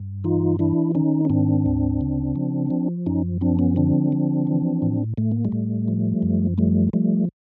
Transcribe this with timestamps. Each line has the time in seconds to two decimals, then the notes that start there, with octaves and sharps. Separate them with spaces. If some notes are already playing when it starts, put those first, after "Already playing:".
Already playing: G2
0.24 E3 D#4 F4
0.59 E3 D4 E4
0.95 D#3 C#4 D#4
1.25 C#4
1.30 G#2 C4 D4
1.66 D2
2.01 C#3
2.36 F3
2.70 F3
3.06 F#2 C#4 D#4
3.41 F3 C4 D4
3.59 B3 C#4
3.76 D3 C4 D4
4.12 F3
4.47 E3
4.82 A2
5.17 A2 A3
5.32 A#3
5.45 G3 A3
5.52 A2
5.88 F3
6.22 F#2
6.58 F3 G3 A3
6.93 F3 G3 A3